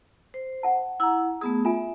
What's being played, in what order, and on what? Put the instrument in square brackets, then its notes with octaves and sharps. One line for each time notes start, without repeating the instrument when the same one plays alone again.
[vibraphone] C5
[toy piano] F#5 A5
[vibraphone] E4 F#5 [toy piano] A#5 E6
[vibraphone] A3 B3 G#4 [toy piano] D#6
[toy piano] F4 G#5 [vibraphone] E5